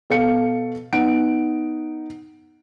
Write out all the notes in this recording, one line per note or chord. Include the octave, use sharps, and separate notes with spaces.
B2 A4 F5 C#7
B3 D#4 F#5 D7